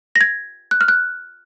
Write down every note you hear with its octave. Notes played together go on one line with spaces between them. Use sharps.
A#6
G#6
F#6
F6
F#6